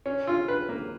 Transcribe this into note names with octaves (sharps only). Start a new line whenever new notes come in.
C#4
F4
B4
A#3